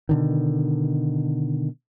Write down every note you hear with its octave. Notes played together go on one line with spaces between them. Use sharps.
B2 D3 D#3